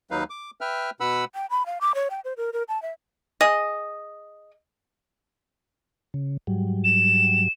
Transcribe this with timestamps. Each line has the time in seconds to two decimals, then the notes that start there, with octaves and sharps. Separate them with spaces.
0.11 D#2 F#3 D#4 B4 F5
0.30 D6
0.61 B4 E5 G5 F6
1.00 B2 B4 F#5 B5 E6
1.34 G5
1.50 B5
1.66 F5
1.81 D6
1.95 C#5
2.10 G5
2.24 C5
2.37 A#4
2.53 A#4
2.68 A5
2.82 E5
3.41 G#4 D#5
6.14 C#3
6.47 G#2 F#3 G3
6.84 E7